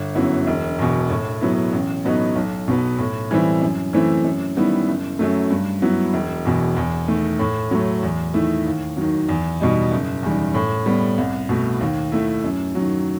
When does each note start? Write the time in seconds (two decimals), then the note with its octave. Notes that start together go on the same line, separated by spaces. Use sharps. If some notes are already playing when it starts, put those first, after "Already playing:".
Already playing: G1
0.15 F#2 F#3 B3 E4
0.47 E1
0.79 E2 B2
1.10 A2
1.41 F#3 B3 E4
1.73 A1
2.05 A2 F#3 B3 D#4
2.36 B1
2.68 B2 F#3 B3
2.98 A2
3.31 E3 G3 C4 E4
3.61 F#2
3.93 E3 A3 C4 E4
4.25 F#2
4.56 D#3 G3 B3 E4
4.88 F#1
5.19 F#2 F#3 A3
5.51 G2
5.82 F#3 B3 E4
6.14 E1
6.45 E2 B2
6.76 E2
7.08 D#3 A3
7.39 A2
7.71 F#3 A3
8.03 E2
8.34 D#3 A3 E4
8.66 D#2
8.97 D#3 F#3
9.29 E2
9.61 B2 G3 D#4
9.91 F#1
10.23 E2 D#3 G3
10.54 A2
10.86 G3 B3
11.18 C2
11.49 B2 A3
11.81 D#2
12.12 D#3 A3 E4
12.44 F#2
12.75 D#3 F#3